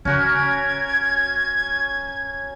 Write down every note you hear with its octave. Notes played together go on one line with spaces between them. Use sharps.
C#3 C#4 F#4 A#4 G#6